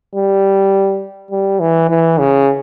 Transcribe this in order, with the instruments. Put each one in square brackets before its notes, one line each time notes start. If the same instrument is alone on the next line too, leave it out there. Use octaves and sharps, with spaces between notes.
[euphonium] G3
G3
E3
E3
C#3